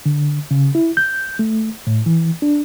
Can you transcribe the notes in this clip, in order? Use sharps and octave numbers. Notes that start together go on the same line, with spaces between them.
D3
C#3
E4
G6
A3
A2
E3
D4